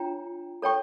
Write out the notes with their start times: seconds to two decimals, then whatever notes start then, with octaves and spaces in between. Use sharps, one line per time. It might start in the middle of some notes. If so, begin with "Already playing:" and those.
Already playing: D4 F4 C#5 G5 A#5
0.62 A4 C#5 G5 C#6